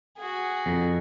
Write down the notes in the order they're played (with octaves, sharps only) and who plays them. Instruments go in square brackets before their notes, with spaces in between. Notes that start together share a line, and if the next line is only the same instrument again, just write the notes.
[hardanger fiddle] F#4 G#4
[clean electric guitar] F2